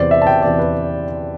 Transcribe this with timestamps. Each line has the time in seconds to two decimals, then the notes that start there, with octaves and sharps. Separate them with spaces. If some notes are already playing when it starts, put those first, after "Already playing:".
Already playing: E2 C3 E3 C5 D5
0.11 E5
0.22 A5
0.27 G5
0.42 E2 C3 E3 D5
0.59 B4